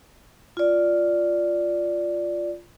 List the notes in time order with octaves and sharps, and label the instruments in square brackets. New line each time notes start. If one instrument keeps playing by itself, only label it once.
[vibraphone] F4 D5